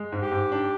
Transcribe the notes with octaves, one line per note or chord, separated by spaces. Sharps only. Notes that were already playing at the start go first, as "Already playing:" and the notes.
Already playing: G#3
G#2
G4
G#2
D4